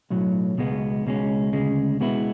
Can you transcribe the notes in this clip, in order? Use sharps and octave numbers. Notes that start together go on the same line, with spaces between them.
B1 A2 F#3
C#2 B2 G#3 B3
C#2 B2 G#3 C#4
D2 C#3 G#3
B2 G#3 B3 E4